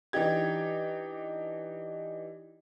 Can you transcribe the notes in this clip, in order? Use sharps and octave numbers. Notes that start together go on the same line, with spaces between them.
E3 D4 D#4 G4 G#6